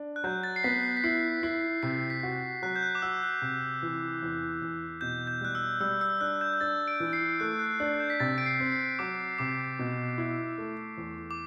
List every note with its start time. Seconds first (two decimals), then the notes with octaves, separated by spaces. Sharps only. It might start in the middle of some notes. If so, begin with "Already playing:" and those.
Already playing: D4
0.16 F#6
0.24 F#3 G6
0.43 A6
0.56 C7
0.64 B3 B6
0.83 C7
0.97 B6
1.04 E4 C7
1.43 E4 B6
1.83 C3 C7
2.10 B6
2.23 F#4
2.62 F#3 F#6
2.76 G6
2.83 F#6
2.95 D6
3.02 F#4 E6
3.23 F#6
3.42 C3
3.83 E3
4.22 E2
4.62 E2
5.01 B2 G6
5.27 G6
5.41 G3 F#6
5.55 E6
5.80 G3 E6
6.01 E6
6.21 D4 F#6
6.41 G6
6.54 G6
6.60 D4 A6
6.88 D7
7.00 E3
7.13 C7
7.40 A3 F#6
7.59 F#6
7.80 D4 F#6
8.00 G6
8.10 B6
8.20 C3 A6
8.38 D7
8.46 C7
8.60 C4
8.72 C7
8.99 F#3 D6
9.38 C3 D6
9.79 B2
10.18 E4
10.58 A3
10.97 E2
11.31 D6